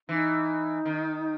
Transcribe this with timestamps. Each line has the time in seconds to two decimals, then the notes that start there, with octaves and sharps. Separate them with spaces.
0.09 E3 D#4
0.86 D#3